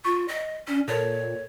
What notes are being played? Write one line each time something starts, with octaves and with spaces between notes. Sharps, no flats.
F4 C#6
D#5
C#4 D4
A#2 A4 A#4 C#5 A5